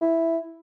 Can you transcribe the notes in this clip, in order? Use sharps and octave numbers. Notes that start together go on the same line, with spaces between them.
E4